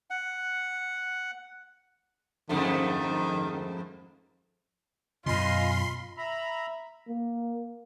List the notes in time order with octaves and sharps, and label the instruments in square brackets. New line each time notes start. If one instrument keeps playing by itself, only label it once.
[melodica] F#5
[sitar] F2 G#2 A3 [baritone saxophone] D#3
[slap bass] F#2 B2 [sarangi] F4 [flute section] D#5 F5 G#5 [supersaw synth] B5 C6
[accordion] E5 A#5 B5
[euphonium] A#3